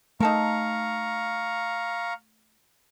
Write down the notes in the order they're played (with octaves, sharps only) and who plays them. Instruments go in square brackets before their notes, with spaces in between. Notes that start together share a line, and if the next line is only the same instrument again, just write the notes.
[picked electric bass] A3 [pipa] D#4 A4 A#4 [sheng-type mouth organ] F5 A#5 C#6